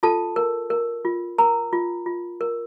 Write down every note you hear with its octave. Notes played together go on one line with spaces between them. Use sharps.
F4 A4 A5
A#4
A#4
F4
A#4 A#5
F4
F4
A#4